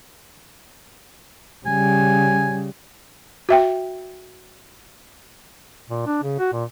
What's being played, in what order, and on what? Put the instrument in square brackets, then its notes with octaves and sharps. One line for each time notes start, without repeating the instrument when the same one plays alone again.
[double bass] C#3 G3 [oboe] G#5
[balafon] F#4 E5 G5
[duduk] A#2
D4
C#3
F#4
A#2